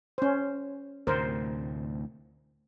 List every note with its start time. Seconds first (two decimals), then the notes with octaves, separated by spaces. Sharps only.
0.18 C#4 C5
1.07 D2 A2 C3 A#4 C5